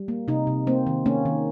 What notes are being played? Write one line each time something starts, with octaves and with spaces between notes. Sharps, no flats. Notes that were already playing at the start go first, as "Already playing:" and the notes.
Already playing: G3
A#3
C3 D#4
C3
A#3 C4
D#3
A#3 C#4
D#3